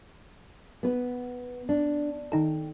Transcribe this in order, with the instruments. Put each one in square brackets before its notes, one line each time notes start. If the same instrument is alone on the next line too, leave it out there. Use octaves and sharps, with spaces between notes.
[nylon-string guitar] B3 B4
D4
[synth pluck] D#3 D#4 A4 [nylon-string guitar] G5